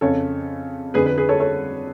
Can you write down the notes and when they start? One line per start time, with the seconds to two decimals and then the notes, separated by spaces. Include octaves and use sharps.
0.01 F2 C#3 A4 C#5
0.94 F2 D3 G#4 B4
1.06 G#4 B4
1.17 G#4 B4
1.29 A4 C#5
1.40 A4 C#5